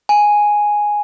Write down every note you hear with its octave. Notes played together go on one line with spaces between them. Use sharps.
G#5